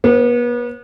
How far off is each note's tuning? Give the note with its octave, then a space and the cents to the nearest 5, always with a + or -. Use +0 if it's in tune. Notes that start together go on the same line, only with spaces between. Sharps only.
B3 -40 C5 +35